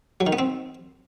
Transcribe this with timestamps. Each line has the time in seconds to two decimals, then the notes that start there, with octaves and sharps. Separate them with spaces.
0.21 F#3
0.27 D#3
0.33 B3
0.39 C4